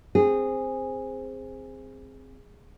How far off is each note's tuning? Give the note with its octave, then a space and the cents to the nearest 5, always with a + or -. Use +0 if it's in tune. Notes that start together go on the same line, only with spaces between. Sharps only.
C4 +0 G#4 -15